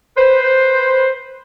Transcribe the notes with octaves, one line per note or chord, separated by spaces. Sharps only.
B4 C5